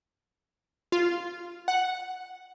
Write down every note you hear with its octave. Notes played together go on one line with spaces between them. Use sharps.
F4
F#5